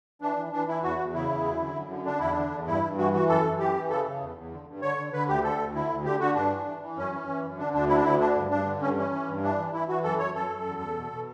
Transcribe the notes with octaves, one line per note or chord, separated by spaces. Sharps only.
E3 D4
E3
E3 D4
E3 E4
E2 F#4
E2
C#3 E4
E2
F#2
D3
F#2
D3
D3 D4
E2 E4
D4
D3
E2
G2 E4
G2
E3 F#4
E3 F#4
F#2 A4
F#2
E3 G4
E3
C#3 A4
C#3
E2
E2
D3
G2
D3 C#5
D3
D3 B4
D2 G4
D3 A4
D2
D3 E4
D2
D3 G4
D3 F#4
G2 D4
E3
E3
E3
F#2 C#4
E3
E3
F#2
D3 D4
D2 D4
D3 E4
D4
D2 E4
D3 D4
G2
G2 D4
D3
G2 C#4
E3 C#4
E3
G2
E3 D4
E3
E3 E4
E3 F#4
F#2 A4
F#2 C#5
F#2 A4
F#2
E2
E2
B2
B2